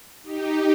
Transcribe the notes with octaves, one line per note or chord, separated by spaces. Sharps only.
D#4 G4